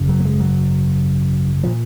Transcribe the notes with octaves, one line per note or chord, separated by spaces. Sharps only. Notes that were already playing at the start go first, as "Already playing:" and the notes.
Already playing: G#1 F#2 C#3
F#3
A#3
G#3
F#3
A#2 F3